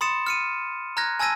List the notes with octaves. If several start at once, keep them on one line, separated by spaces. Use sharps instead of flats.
B5 C6 D#6 A6 C#7 E7
F6 C#7 D#7
A#5 F6 F#6 G#6 A#6
G#5 A5 E6 G#6 A#6 D#7